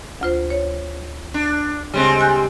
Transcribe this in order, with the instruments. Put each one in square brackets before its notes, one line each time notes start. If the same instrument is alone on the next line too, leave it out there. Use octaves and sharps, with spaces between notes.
[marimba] D2 F4 C5
C#5
[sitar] D4
[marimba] C#3 [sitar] G3 G#3 C4
[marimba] G#5 F#6 G6